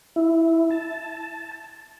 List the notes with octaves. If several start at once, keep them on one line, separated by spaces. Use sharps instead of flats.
E4
A5